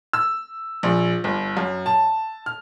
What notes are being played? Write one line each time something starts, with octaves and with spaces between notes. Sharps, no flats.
E6
A#1
G1
F#2
A5
F6